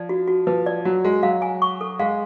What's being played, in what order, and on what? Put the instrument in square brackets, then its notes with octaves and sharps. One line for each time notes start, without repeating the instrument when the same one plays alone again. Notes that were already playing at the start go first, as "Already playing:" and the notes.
Already playing: [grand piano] F3 [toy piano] D5
[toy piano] F#4
F#4
[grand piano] F3 [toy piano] B4
[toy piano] D5
[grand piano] F#3 [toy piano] F#4
[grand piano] G#3 [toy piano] F#4
[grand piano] F#3 [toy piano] F5
[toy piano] G#5
C#6
A4
[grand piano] G#3 [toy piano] F5